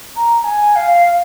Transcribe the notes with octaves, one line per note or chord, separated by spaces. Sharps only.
A#5
G#5
G#5
F5